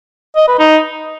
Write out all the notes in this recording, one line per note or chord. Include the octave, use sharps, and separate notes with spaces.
D#5
B4
D#4